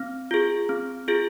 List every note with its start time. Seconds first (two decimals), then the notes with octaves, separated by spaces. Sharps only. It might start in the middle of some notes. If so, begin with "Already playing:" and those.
Already playing: C4
0.31 F4 G#4
0.69 C4
1.08 F4 G#4